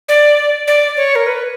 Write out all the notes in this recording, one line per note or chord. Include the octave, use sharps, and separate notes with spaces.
D5
D5
C#5
A#4
B4